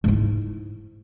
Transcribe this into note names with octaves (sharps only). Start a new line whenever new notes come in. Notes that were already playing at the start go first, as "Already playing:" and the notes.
G#2 E4